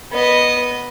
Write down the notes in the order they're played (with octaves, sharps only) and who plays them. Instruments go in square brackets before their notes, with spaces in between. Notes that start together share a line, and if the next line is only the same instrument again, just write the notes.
[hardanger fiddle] B3 D#5